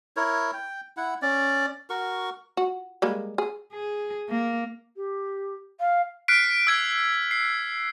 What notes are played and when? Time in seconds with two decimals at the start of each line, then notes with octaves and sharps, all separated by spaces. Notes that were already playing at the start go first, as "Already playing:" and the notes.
0.16 E4 A#4 C#5
0.53 G5
0.97 E4 F#5
1.22 C#4 D5
1.90 F#4 A#4 C#6
2.57 F#4
3.02 G3 G#3 A#3
3.38 G#4
3.73 G#4
4.29 A#3
4.96 G4
5.79 F5
6.28 F6 F#6 B6 C7 D7
6.67 E6 G#6 D7
7.31 C7